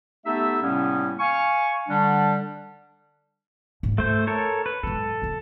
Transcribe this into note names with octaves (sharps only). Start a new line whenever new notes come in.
A3 B3 D#4 G4 A4 E5
A2 C3 G3 A#3 B3 C#4
F5 G#5 C#6
D3 G3 D4
G#2
A3 E4 C5
A4 A#4 C#5
B4
G#2 F#3 A4
F1 F3